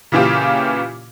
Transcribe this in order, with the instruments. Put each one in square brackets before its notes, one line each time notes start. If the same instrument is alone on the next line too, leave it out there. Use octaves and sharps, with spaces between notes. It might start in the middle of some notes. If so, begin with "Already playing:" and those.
[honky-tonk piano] A#2 C#3 E3 C#4 F4 G4